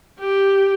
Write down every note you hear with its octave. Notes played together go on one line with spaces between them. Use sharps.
G4